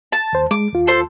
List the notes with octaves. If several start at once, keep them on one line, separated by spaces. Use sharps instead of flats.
A5
D#2 C5
G#3 D6
D#2 F4
A4 C5